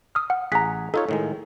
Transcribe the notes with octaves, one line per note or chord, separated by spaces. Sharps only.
D#6 F6
F#5
A1 G#4 F#5 A#5 B6
D#4 F4 A4 C#5
A2 D#3 G#3